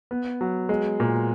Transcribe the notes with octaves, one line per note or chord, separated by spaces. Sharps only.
B3
F#3
G#3
A#2